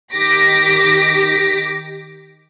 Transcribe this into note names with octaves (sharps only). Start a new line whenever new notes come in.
D#3 G4 D6 A#6 B6